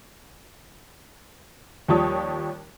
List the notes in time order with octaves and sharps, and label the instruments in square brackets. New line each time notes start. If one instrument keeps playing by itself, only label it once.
[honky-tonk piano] D#2 F3 G3 C#5 A5 D#6